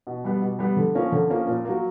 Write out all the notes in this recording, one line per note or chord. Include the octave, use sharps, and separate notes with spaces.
B2
G3 B3
B2
G3 B3
D3
F3 A#3 C#4
D3
F3 A#3 C#4
A#2
F#3 A#3